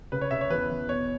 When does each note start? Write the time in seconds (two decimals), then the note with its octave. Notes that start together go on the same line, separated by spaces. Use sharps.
0.12 C#3 B4
0.21 C#5
0.31 C#3 E5
0.41 C#5
0.50 E2 B4
0.70 E2
0.89 B2 C#5